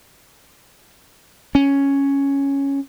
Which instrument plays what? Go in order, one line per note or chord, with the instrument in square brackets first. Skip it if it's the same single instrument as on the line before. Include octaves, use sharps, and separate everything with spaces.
[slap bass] C#4